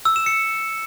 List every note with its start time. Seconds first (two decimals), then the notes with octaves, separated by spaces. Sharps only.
0.05 E6
0.16 E7
0.26 C#7